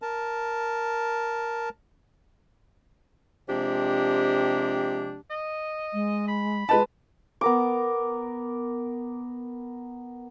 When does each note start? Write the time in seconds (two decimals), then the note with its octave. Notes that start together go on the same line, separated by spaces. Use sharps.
0.02 A#4 A5
3.49 C3 F3 G#3 D4 G4
5.30 D#5
5.94 G#3
6.28 B5
6.69 G#3 B4 D#5 A5
7.41 B3 A#4 D6